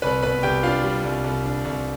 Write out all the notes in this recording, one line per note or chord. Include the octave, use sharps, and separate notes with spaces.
C2 B4 B5
B2 B4 B5
C2 G4 G5
D4 F4 F5
G3
C2
C2
D4
C2